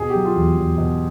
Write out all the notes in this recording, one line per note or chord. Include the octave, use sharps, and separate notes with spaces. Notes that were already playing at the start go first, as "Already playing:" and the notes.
Already playing: B2 G#4
G4
F#3
F4
E2
E2
B2